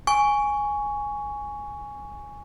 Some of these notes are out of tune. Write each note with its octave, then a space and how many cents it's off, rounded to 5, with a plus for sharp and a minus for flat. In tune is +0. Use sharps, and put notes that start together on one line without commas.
G#5 +0 C#6 +15